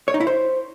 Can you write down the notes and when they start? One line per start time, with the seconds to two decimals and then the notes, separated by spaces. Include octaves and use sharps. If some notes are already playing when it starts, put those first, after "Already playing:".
0.08 C#5
0.14 D#4
0.20 E4
0.27 C5